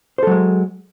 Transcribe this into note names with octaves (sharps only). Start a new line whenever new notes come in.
F#3 G#3 A4 C5